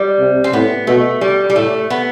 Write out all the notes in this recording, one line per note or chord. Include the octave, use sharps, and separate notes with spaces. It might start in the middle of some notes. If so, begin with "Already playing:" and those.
Already playing: G3
C3
C4
A2 B3
B2 A3
G3
G3
A2 A3
B3